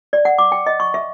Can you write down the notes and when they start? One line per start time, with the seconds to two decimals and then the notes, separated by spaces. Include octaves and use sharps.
0.13 D5
0.25 F#5
0.38 D6
0.52 G5
0.67 D#5
0.80 C#6
0.94 E5